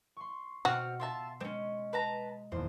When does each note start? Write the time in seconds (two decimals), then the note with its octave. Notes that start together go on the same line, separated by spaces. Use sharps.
0.17 C6 C#6
0.65 B2 C4 F#4 F6 C#7
1.00 F4 E5 A5 C6
1.41 G#3 C4 C#4
1.93 B4 A5 A#5
2.52 D#1 E2 C5